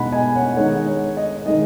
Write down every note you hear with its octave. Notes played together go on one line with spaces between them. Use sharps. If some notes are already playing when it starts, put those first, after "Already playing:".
Already playing: B2 G#3 D#4 F#5 G#5 B5
D#5 G#5
C#5 F#5
D#3 G#3 D#4 C#5 F#5
C#5
D#5
D#3 G#3 D#4 D#5